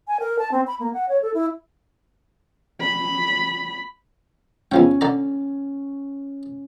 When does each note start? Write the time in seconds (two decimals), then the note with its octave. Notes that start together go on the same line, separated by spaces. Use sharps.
0.07 G#5
0.20 A#4
0.38 A5
0.51 C4
0.67 B5
0.80 A#3
0.93 F#5
1.09 C#5
1.22 A4
1.34 E4
2.81 B5
4.71 E2 F3 C#4 G5
5.01 D3 D5 A#5